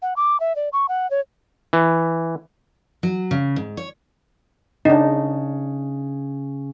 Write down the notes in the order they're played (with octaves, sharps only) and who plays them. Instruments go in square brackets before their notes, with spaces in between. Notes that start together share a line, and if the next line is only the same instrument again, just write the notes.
[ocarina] F#5
D6
E5
D5
C#6
F#5
C#5
[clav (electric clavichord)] E3
[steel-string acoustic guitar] F#3
C#3
G#2
C#5
[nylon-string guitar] C#3 [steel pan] D4 D#4